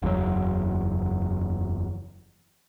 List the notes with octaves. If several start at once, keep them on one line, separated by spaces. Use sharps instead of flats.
F#1 E2 G#2 F#3